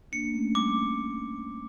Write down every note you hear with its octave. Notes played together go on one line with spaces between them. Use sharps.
A#3 D4 C#7
A#3
A3 C#4
G3 A#3 D6